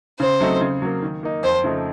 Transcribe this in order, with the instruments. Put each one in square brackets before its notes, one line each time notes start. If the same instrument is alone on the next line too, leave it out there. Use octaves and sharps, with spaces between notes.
[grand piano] C#3 [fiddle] C5
[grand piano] F#3 A3 C4 D#4
C#3
F#3 A#3
D#3
A#3 D#4
[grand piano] F2 [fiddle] C5
[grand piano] C#3 F3 A3 D#4